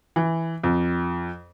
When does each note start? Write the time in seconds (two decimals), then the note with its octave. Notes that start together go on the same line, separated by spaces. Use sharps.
0.16 E3
0.64 F2